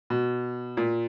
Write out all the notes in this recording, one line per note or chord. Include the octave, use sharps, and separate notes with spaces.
B2
A#2